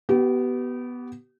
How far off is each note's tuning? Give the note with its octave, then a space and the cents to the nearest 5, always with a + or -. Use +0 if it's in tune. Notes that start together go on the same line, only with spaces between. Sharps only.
B3 +0 G4 -35